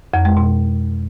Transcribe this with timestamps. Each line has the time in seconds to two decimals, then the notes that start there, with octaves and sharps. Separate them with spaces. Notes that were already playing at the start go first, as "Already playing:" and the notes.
0.14 F2
0.25 G#3
0.37 B2